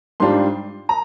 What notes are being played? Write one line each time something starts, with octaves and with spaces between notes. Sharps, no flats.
G#2 G3 D4 F4 C6
A#5